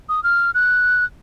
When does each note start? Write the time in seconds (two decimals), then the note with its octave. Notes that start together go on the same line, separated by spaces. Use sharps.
0.09 D#6
0.23 F6
0.54 F#6